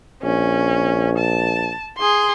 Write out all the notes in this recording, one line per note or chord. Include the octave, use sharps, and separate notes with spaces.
A#1 C#4
A5
G#4 C6